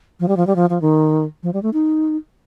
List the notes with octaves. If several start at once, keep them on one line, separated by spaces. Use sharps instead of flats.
F3
G3
F3
G3
F3
F3
D#3
F3
G3
A3
D#4